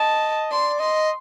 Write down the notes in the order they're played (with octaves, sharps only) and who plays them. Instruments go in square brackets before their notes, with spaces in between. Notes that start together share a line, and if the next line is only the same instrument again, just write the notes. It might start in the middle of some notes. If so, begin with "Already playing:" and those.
Already playing: [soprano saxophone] D#5 [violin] A5
[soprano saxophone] D5 [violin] C6
[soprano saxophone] D#5 [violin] C6